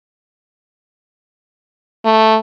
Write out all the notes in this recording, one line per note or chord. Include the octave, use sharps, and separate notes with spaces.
A3